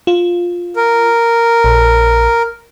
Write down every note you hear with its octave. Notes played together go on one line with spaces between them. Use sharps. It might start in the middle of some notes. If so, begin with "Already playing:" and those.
F4
A#4
A#1